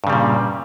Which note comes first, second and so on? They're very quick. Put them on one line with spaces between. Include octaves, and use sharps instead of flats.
G2 C#3 G3 A#2